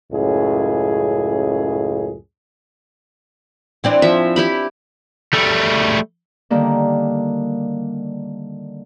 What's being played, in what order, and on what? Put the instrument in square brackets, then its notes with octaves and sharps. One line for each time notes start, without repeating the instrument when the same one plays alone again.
[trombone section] C#2 F#2 A2 G#4
[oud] E3 C4 D4
[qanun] F3 E5
E4 G4 B5
[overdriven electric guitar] G3 A3
[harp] D3 D#3 G3 A#3